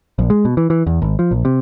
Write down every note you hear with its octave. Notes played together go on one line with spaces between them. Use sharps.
A#1
G#3
B2
E3
E3
E2
G#1
F3
A#1
C3